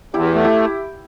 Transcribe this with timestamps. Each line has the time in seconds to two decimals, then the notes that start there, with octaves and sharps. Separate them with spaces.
0.14 E2 E4 G4
0.34 A3
0.44 E4 G4